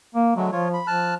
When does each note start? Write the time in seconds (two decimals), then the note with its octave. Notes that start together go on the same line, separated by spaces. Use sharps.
0.15 A#3
0.37 D3 F#3 G#3 A3
0.52 F3 F4 C#5
0.73 B5
0.87 F3 A5 F6 F#6